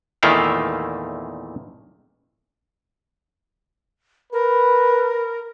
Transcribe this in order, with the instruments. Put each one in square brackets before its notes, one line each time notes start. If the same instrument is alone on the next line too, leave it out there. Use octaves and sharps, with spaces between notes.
[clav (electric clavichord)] E2 A#2 D#3 A3 E4 F5
[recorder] A#4 [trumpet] B4